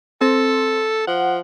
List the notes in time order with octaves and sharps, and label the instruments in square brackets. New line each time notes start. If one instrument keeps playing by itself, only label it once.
[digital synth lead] C4 [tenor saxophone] A4
[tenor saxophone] F3 [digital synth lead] F#5